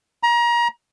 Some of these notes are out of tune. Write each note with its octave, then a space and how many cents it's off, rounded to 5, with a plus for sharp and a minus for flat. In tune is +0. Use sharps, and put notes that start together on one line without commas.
A#5 +30